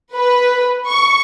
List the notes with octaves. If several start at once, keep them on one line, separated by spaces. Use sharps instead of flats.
B4
C#6